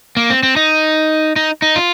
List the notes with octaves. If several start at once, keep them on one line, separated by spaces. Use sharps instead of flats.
A#3
C4
C4
D#4
D#4
D#4
F4